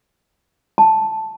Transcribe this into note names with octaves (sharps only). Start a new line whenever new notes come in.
A5